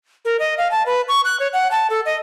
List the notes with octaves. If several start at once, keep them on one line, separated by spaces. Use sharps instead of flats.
A#4
D#5
F5
A5
B4
C#6
F#6
C#5
F#5
A5
A4
D#5